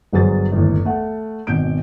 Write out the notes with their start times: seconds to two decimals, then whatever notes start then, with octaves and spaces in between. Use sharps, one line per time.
0.13 G1 F#3 G#4 C5 D#6 A6
0.52 G1 D#2 A2
0.85 A3 F#5
1.47 G#1 B2 G6 D7